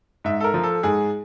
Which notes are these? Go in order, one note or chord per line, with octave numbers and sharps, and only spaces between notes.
G#2 E5
A4
A#4
F3
A4
G#2 G#4